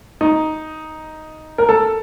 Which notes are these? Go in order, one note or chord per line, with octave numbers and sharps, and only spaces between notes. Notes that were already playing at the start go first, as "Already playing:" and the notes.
D#4
A#4
A4